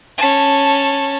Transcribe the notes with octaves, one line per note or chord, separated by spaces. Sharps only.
C#4 A5